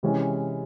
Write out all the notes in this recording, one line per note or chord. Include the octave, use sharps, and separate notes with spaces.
C3 E3 G#3 C#4